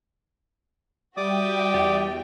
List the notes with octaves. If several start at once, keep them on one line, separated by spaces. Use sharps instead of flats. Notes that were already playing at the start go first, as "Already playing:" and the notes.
G3 F#4 D5 E5 G5 D6 D#6
E2 G3